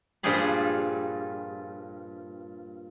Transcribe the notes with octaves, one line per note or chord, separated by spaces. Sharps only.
G2 A#2 F3 G4 G#4 B5